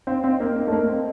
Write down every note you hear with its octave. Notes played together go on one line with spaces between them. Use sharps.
C4 F5
C4
D#5
A#3
A#3
A3
A#3
C4